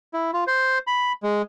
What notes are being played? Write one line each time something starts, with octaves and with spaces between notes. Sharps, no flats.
E4
F4
C5
B5
G#3